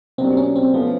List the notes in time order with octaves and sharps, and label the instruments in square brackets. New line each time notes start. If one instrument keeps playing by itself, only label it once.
[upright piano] B2 F#3 A#3 D4 G4 [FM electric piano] C4
[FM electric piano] C#4
C4
[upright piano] F3 A3 C#4 [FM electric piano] B3